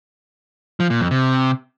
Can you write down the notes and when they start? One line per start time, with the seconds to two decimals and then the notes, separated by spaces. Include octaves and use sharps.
0.80 F3
0.90 A#2
1.01 F2
1.11 C3